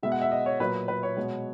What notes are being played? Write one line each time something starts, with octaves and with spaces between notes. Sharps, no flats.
B2 G#3 B3 E5
F#5
E5
D#5
C#5
A#2 F#3 A#3 B4
B4
C#5
B2 G#3 B3